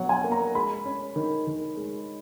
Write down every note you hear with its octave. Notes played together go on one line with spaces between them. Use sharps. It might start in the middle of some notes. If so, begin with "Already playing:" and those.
Already playing: B2 F#3 F#5
G#5
A#3
A#5
G#3 B5
C#4
D#3
D#3
G#3